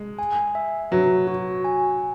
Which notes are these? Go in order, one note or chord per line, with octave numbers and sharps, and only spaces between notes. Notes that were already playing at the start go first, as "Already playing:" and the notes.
Already playing: G#3
G#5
E5
F#3 B4
F#4
G#5